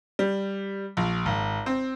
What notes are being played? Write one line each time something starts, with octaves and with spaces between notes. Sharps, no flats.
G3
A#1
G#1
C4